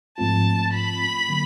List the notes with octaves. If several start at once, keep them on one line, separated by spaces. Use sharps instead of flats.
G#2 F3 A3 C4 F4 A5
B5
D3 F#3 A#3